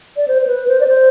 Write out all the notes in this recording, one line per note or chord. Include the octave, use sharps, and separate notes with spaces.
D5
C5
C5
B4
C5
D5
C5